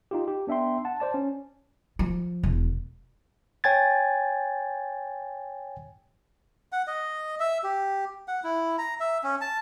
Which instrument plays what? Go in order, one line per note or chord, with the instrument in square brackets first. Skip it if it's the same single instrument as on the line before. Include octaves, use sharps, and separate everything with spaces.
[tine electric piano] D#4 F4 G4
G4
B3 D4 E5 G5 C6
F#5 A5
C5 D5 A5
C#4
[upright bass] F3
E1
[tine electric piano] C#5 G5 G#5 G#6 A6
[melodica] F#5
D#5
E5
G4
F#5
E4
A#5
E5
C#4
A5